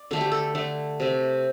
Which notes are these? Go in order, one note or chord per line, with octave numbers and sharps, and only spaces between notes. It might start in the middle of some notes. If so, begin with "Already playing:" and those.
Already playing: D5
D3 A3 A4
G4
A4
D3 A3
C3 A3